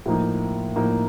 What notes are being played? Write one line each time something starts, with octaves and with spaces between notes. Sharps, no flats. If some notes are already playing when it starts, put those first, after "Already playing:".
A2 F3 A#3 D#4
A2 F3 A#3 D#4